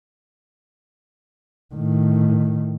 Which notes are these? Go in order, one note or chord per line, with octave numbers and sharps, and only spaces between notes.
A2 D#3